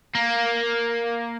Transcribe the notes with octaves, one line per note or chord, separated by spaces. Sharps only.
A#3